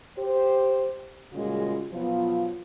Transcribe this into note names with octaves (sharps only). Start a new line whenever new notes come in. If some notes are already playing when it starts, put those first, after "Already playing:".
G4 C5
A#2 C#3 G3 G#3 F4 F#4
B2 F3 F#3 B3 F4